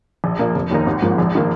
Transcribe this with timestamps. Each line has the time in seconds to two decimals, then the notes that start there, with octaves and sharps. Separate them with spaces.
0.24 A#1
0.39 A#2 A#3
0.55 F1
0.71 D#2 D#3 A#3 D#4
0.86 G#1
1.02 G#2 F3 A#3
1.18 A#1
1.35 D#3 A#3